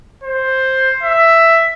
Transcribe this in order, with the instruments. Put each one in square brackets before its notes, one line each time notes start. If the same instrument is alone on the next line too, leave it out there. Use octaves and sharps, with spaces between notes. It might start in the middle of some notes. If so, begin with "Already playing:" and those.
[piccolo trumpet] C5
E5